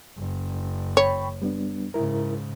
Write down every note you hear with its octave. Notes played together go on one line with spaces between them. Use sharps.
F#1
C#5 G5 B5 C#6
G3 B3 D4
G#2 C#3 E4 A#4